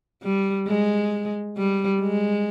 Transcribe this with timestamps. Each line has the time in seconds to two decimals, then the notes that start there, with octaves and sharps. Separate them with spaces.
0.23 G3
0.67 G#3
1.57 G3
2.01 G#3